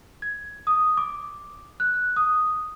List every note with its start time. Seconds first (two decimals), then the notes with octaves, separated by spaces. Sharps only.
0.22 G#6
0.67 D#6
0.97 D6
1.80 F#6
2.16 D#6